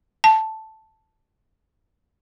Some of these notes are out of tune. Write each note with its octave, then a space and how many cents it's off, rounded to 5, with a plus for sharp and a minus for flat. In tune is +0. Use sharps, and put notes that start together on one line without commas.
A5 +0